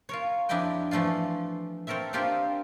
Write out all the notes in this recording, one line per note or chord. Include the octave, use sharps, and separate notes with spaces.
F4 A#4 C#5
F2 D4 E4 G4 D#5 G5
E3 F3 A3 D4 F4
C4 A4 A#4 C#5 E5
C4 D4 F4 G4 A#4 C5